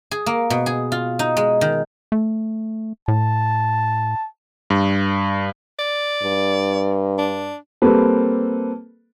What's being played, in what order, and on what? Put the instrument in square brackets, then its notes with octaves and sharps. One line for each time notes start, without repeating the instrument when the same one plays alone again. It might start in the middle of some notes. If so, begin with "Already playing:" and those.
[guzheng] G#4
A#3
B2
G#4
F4
D#4
G#3
D#3
[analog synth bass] A3
[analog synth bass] A2 [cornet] A5
[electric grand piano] G2
[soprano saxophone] D5
[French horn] G2
[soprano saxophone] D4
[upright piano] G3 A#3 C4 A4 B4